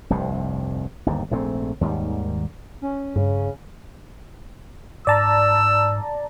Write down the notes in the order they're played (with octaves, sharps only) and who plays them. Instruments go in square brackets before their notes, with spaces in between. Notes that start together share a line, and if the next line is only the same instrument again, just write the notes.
[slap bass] F1 C2 G2 C3
G1 D#2 G#2
A#1 G#2 A3 C4
D#2 G#2 D#3 G3
[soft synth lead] C#4
[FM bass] G2 [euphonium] C#3
[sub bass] G#2 [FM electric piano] D5 A5 A#5 [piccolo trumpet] E6